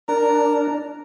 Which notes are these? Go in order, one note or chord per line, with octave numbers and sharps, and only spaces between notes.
D4 A#4